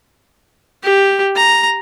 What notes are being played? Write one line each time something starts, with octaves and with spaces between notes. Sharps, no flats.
G4
A#5